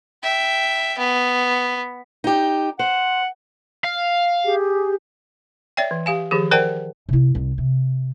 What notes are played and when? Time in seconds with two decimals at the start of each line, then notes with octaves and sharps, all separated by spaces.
0.23 E5 G5
0.98 B3
2.24 D#4 G4
2.79 C5 F#5
3.84 F5
4.44 G4 G#4
5.77 C#5 D5 E5 G5
5.91 E3
6.06 G4 F5 G#5
6.31 D#3 F3 G4 G#4
6.51 A#4 C5 D5 F#5 G5 A5
7.09 C3 E4
7.35 C2
7.58 C3